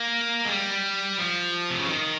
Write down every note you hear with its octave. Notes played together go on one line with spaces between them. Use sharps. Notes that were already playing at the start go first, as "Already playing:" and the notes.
Already playing: A#3
G#3
G3
F3
C3
C#3
D#3